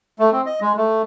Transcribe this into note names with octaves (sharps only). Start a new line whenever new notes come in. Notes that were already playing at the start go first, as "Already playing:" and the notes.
A3
C4
D#5
G#3
A3